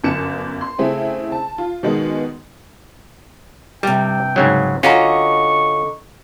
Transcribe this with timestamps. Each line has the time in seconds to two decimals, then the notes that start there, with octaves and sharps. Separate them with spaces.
0.04 G1 F#2 C#7 E7
0.61 C6
0.78 C#3 A3 C4 E4 G#4
1.32 A5
1.58 F4
1.83 B2 D#3 G#3 B3
3.83 G2 C3 G3 G5
4.36 G#2 C#3 F#3
4.83 D3 C#4 F4 F#4 D#5 A#5 C#6